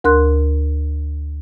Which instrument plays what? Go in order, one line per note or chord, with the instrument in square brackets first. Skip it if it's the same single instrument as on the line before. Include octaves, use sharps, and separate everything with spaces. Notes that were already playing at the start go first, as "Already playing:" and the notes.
[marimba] D2 A#4 C6 F#6